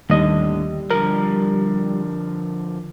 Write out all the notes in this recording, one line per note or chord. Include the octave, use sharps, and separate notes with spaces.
D#2 A2 D3 G3 D#5
D3 F3 A#4